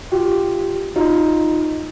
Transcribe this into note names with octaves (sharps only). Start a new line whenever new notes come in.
F4 G4
D#4 F4